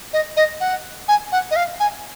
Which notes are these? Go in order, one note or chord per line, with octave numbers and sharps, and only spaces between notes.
D#5
D#5
F#5
G#5
F#5
D#5
F5
G#5